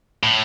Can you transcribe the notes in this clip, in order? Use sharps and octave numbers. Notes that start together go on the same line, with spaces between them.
A2